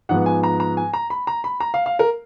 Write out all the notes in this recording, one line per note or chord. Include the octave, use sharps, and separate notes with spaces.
G#2 F3 B3 F#5
G#5
A#5
A#5
G#5
A#5
B5
A#5
B5
A#5
F5
F5
A#4